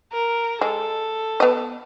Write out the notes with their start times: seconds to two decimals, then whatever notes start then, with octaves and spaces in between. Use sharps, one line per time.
0.12 A#4
0.61 G#3 A4
1.40 B3 D#5